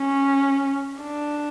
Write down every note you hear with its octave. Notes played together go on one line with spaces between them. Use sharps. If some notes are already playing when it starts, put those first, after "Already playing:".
Already playing: C#4
D4